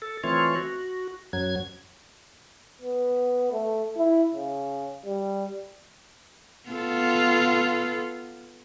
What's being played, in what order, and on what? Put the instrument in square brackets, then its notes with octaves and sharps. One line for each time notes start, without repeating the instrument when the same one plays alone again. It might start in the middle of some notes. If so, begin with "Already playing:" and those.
[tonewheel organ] A4
E3 A3 C4 F4 C#5
F#4
F#2 F#3 G#6
[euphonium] B3
A3
E4
C#3
G3
[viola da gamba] B3 F4 A4